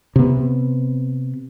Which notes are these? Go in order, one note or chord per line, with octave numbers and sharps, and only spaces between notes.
C3 B3